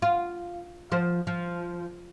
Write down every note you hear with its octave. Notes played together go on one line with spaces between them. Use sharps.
F4
F3 C5
F3